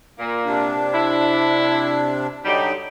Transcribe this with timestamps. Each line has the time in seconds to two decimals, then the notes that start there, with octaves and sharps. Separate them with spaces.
0.19 A#2 A#3
0.45 C3 D4
0.94 E4
2.45 D3 F#3 G3 D#4 G4